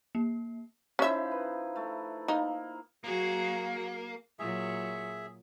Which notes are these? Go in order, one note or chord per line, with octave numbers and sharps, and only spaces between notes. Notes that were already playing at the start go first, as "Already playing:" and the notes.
A#3
F3 C#4 D#4 E4 E5
B4
A3
A#3 D#4
F#3 A#3 F#4 G#4
A#2 F#3 G#4 E5